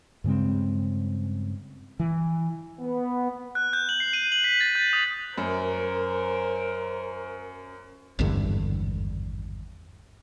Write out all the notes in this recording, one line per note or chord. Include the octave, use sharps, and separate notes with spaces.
G2 C#3 G#3 C4
E3
B3
F#6
G6
F#7
C7
D#7
F#7
B6
A6
G6
D#6
F#2 A#4 C5
G#1 E2 G2 D3